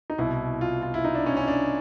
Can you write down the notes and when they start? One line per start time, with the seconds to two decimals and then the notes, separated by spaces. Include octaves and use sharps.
0.10 D#4
0.18 C2 B2 E4
0.61 F4
0.82 F4
0.94 E4
1.05 D#4
1.15 D4
1.26 C#4
1.37 C#4
1.48 D4